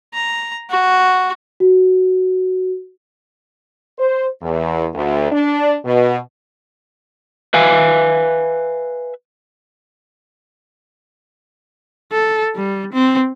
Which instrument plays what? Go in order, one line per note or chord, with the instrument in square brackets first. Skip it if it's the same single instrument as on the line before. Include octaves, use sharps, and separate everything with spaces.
[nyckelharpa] A#5
F#4
[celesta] F#4
[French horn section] C5
E2
D2
D4
B2
[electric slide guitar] B4 E5 F5 G#5
[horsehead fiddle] A4
G3
C4